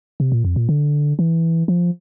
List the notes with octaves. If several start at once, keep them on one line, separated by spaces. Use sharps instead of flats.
C3
A#2
F2
A#2
D3
E3
F3